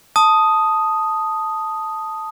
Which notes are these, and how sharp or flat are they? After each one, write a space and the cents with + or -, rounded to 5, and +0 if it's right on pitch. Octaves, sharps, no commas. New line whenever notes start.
A5 +0 D#6 +0